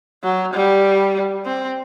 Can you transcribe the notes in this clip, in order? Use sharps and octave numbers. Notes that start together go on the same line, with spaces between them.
F#3
G3
C4